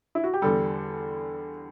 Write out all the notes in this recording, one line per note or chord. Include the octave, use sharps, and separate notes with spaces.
E4
F#4
G4
E2 D3 G3 A4